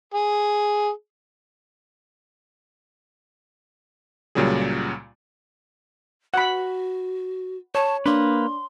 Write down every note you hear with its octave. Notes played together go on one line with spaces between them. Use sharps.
G#4
C#2 A#2 C#3 F#3 G3 G#4
F#4 F#5 B5
C#5 A5
A#3 D4 B4 C6